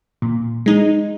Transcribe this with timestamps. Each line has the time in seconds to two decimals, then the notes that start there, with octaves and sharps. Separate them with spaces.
0.22 A#2
0.66 G#3 D#4